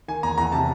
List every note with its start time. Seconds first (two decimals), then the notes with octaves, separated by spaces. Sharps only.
0.08 D#3 G#5
0.23 E2 A#5
0.38 E2 A#5
0.52 C3 A5